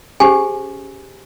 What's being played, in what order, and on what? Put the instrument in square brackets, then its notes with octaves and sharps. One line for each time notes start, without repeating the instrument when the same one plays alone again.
[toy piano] C#4 G4 G#4 C5 G#5